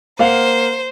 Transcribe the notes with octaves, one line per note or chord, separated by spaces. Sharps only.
A#3 C5 F5 F#5